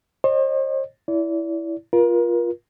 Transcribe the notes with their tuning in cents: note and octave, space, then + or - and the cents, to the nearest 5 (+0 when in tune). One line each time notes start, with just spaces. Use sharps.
C5 +45 D#5 -40
E4 +0 D5 -35
F4 +0 A#4 +35